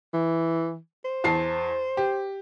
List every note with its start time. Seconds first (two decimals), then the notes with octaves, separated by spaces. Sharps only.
0.14 E3
1.05 C5
1.24 E2 A5 C7
1.97 G4